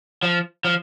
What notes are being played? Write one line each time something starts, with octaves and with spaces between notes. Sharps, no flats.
F3
F3